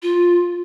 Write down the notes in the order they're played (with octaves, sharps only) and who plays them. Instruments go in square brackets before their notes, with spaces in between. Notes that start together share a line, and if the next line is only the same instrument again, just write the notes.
[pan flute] F4